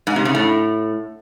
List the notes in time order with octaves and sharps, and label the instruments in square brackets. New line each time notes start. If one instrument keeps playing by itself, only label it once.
[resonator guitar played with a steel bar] G#2
C3
C#3
A2